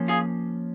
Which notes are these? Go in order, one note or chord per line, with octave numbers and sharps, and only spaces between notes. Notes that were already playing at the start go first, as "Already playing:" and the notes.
Already playing: F3 A#3 C#4
F4 G#4